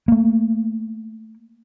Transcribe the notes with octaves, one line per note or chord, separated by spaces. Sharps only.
A3 A#3